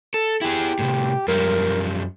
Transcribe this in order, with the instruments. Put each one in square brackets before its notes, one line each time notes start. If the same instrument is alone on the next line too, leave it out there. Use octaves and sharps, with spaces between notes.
[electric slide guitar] A4
[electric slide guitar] E4 G#4 [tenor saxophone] G4
[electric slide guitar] A2 C3
[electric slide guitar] F#2 F3 G3 [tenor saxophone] A#4